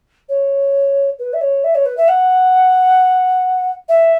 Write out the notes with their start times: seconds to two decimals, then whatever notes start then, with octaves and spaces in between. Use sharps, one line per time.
0.29 C#5
1.19 B4
1.33 E5
1.41 C#5
1.64 E5
1.75 C#5
1.85 B4
1.97 E5
2.08 F#5
3.88 E5